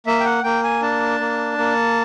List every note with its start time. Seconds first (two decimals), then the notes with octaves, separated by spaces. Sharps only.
0.07 A#3 E5
0.20 G5
0.25 F#5
0.44 A#3 G5
0.64 G#5
0.82 D4 A5
1.20 A#3
1.58 A#3